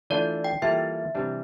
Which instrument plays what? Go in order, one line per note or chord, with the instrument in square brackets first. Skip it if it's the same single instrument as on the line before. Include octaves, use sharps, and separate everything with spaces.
[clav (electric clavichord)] E3 A3 D4 F4 [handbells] D5
[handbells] G5
[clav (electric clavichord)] E3 G3 A#3 F4 A4 [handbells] E5
[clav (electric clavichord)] C3 E3 G3 D4